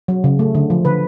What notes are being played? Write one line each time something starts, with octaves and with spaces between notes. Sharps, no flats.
F#3
C#3
A3
D3
F3
D3 B4